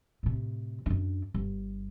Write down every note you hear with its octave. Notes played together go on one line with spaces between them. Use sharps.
A2 C3
F#2 D4
G1